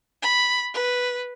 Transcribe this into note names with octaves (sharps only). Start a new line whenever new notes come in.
B5
B4